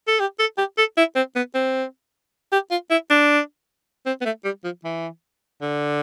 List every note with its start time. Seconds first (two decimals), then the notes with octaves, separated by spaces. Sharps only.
0.08 A4
0.20 G4
0.39 A4
0.58 G4
0.78 A4
0.97 E4
1.16 C4
1.36 B3
1.54 C4
2.52 G4
2.71 F4
2.91 E4
3.10 D4
4.06 C4
4.21 B3
4.25 A3
4.44 G3
4.64 F3
4.84 E3
5.61 D3